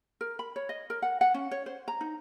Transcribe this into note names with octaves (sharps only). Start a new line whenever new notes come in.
A#4
B5
C#5
D#5
A#4
F#5
F#5
C#4
C#5
C5
A#5
D#4